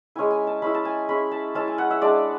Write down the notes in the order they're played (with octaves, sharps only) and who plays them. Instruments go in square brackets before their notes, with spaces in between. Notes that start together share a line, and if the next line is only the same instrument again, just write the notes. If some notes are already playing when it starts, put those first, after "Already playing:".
[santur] G#3 C#4 E4 G#5
G#5
A5
G#3 C#4 E4 B5
A5
G#5
G#3 C#4 E4 B5
A5
G#3 C#4 E4 A5
G#5
F#5
E5
G#3 D4 D5